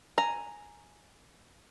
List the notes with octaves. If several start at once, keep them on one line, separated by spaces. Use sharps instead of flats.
G#5 A#5